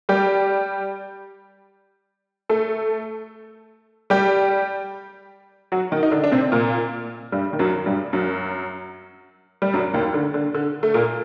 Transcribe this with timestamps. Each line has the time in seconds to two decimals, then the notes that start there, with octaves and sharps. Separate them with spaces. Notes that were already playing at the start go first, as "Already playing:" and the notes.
0.09 G3 G4
2.49 A3 A4
4.10 G3 G4
5.72 F#3 F#4
5.92 D#3 D#4
6.03 D#4
6.11 D3 D4
6.24 D4
6.32 C3 C4
6.52 A#2 A#3
7.32 G2 G3
7.53 D#3
7.59 F#2 F#3
7.86 G2 G3
8.13 F#2 F#3
9.62 G3
9.74 F#2 F#3
9.93 D#2 D#3
10.14 D3
10.34 D3
10.54 D3
10.83 A3
10.94 A#2 A#3